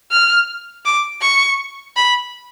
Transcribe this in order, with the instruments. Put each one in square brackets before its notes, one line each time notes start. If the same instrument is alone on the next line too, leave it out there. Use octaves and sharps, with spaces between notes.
[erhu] F6
D6
C#6
B5